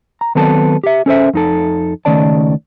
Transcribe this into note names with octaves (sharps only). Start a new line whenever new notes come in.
A#5
D#3 F#3 B3 C4 A4 A5
G4 E5
C#4 A4 C5 E5
F2 D#4 A4
C#2 D#3 A3 C#4 D5 A5